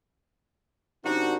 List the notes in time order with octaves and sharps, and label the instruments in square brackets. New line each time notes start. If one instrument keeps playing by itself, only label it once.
[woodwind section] F#2 C3 D#4 [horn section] D4 F#4